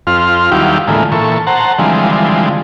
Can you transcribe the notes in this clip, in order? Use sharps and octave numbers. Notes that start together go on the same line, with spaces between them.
F2 C4 F4 F6
D#2 F#3 G3 E4 G4 F5
A2 D3 E3 G#3 A#3 F4
A#2 E3 A4 C#6
C5 F#5 A5 A#5
D3 E3 F3 G3 G#3 C4